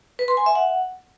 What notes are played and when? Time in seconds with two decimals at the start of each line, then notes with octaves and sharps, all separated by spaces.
0.19 B4
0.28 C6
0.37 G#5
0.46 E5
0.55 F#5